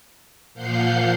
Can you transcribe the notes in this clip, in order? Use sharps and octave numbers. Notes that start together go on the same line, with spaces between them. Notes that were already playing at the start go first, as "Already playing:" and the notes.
A#2 F3 F5 F#5 G6 C7